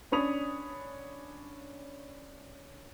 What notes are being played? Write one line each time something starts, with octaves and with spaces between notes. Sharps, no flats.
C#4 D4 C#5 B5 D#6 F7